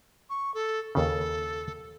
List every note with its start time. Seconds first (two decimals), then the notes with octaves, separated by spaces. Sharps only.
0.30 C#6
0.54 A4
0.95 D#2 C#3 A4